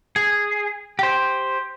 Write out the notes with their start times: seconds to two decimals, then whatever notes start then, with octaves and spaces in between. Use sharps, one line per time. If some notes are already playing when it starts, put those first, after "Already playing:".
0.16 G#4
0.99 G4 C5